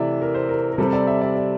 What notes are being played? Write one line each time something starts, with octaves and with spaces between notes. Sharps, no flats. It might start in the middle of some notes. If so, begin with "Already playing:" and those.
Already playing: C3 E3 A3 D5 E5
A#4
C5
A#4
A#4
C3 G3 C4 A4
D5
E5
D5
D5